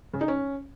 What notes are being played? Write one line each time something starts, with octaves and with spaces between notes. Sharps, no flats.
C#3
D#4
C#4